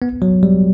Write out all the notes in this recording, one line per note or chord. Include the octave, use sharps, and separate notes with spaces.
B3
F#3
G3